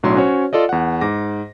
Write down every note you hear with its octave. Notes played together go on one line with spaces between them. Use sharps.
B1 A2 F#3 D4 C6
C#4 F#4 C5 C#5
F4 A4 D5 D#5
E2 F#5
G#2 D6 A#6